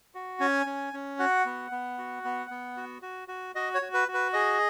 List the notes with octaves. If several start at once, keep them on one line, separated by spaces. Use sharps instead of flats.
F#4
C#4 G#5
C#4
C#4
F#4 F#5
B3
B3
F#4
B3
B3
F#4
F#4
F#4
F#4 D#5
C#5
F#4
B4
F#4
B4
G#4 D#5